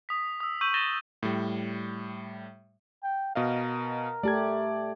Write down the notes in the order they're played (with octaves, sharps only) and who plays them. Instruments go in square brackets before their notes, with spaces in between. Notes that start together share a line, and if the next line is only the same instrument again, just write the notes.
[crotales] D#6 B6
D#6 E6
C#6 E6 G6 D#7 F#7
A6 A#6 D#7 E7 G7
[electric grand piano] A2 G3
[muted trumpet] G5
[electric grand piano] B2 D#5 F5 [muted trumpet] A#4
[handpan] A3 G4 [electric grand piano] D5 A5 G#6